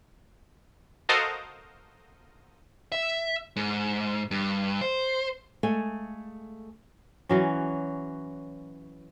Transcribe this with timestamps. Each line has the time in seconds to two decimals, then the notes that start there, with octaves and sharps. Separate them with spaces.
1.09 F#4 A4 A#4 C5 D#5 F5
2.92 E5
3.56 G#2
4.31 G2
4.81 C5
5.63 G#3 A3 A4 F5 G#5
7.29 E3 F#3 C#4